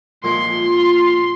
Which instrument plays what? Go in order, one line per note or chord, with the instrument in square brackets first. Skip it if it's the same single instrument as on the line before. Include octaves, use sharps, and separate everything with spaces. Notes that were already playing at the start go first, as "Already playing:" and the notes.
[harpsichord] A#2 F3 G#3 [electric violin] C6